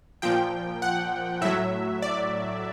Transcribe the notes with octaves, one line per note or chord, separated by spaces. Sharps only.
A#2 F3 G5
F#5
A2 F#3 E5
D5